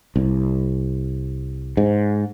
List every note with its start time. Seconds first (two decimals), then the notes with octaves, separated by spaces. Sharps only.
0.16 C2
1.77 G#2